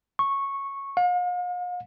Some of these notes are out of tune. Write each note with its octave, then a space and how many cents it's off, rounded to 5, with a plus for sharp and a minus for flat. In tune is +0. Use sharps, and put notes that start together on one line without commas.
C#6 -10
F5 +45